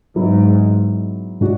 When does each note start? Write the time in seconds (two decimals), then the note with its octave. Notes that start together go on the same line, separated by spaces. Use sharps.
0.16 G#2 F#3 B3 E4
1.41 A2 G#3 D4 F#4